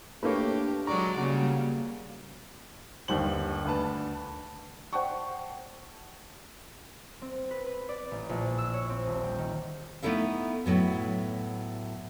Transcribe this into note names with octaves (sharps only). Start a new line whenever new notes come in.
A3 A#3 D4 G4 B4 C#5
F#3 G#3 D5 A#5 C#6
C#3 G3 A#3 F#4
G1 D#2 G3 C5 F#7
D2 B4 A5
C5 D5 F#5 G5 A5 C#6
C4
B4
B4
D5
A1
A#1
E6
C#5
C4
D#1
G5
D#3
A3 B3 D#4 E4 A4 F5
A2 F#3 B3